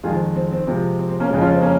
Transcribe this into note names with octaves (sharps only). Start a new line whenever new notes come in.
F2 D#3 G#3 F4 G#4
C4
C4
C4
C3 F3 G#3
C4
C4
A#3 C#4
F2 C#3 G#3
C#4 F4
C4
A#3 C#4